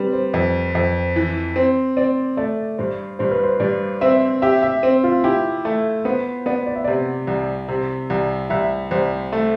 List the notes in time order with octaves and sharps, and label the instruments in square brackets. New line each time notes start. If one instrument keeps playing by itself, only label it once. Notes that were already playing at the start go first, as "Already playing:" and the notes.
Already playing: [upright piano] G3 [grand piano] C4 D4 B4
[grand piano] C5
[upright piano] F2
F2
E3
C4
[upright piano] C4 [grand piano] D5
[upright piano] A3 [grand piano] D5
[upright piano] G2 [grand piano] C5
[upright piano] G2 [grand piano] C5
[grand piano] B4
C5
[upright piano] G2 [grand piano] D5
[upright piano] C4 [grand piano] E5
[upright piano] G4 [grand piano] E5
[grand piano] E5
[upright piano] C4
[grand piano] F4
[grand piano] E4 [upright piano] G4
[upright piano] A3
[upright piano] B3 [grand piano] C5
[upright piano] B3 [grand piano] D5
[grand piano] D5
E5
[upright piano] C3 [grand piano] D5
[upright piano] C2
C3
C2
[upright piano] C2 [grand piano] E5
[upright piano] C2 [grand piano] C5
[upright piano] A3